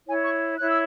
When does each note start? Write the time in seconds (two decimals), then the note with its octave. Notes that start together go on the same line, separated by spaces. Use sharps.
0.06 E4 C#5 G#5
0.24 C#6
0.57 E4 C#5 F#6
0.68 E6